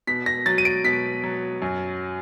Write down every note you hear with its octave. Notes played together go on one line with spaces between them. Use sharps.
B2 B6
A#6
F#3 A6
D#7
D7
B2 B6
F#3
F#2